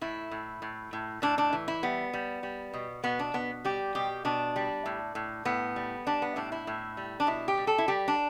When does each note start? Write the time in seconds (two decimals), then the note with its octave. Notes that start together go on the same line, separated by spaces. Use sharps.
0.01 A2 E4
0.31 A2
0.62 A2
0.93 A2
1.22 A2 D4
1.38 D4
1.53 E3
1.68 E4
1.83 G3 B3
2.13 G3
2.43 G3
2.74 B2
3.04 B2 B3
3.19 D4
3.34 B2 B3
3.65 G3 G4
3.95 B2 G4
4.25 B2 D4
4.56 G3
4.86 A2
5.15 A2
5.45 A2 B3
5.76 G3
6.07 G3 D4
6.22 B3
6.36 A2 D4
6.52 E4
6.67 A2
6.97 G3
7.20 D4
7.27 B2 E4
7.48 G4
7.57 G3
7.67 A4
7.78 E4
7.88 G3 G4
8.08 D4